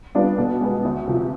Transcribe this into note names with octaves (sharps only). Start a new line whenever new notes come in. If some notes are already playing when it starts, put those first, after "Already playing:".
G3 B3 D4 F4
B2
G#3 B3
D2
C3 F3